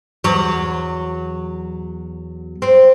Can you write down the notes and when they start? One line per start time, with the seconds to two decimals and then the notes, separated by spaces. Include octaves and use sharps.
0.24 E2 F#3
2.62 C4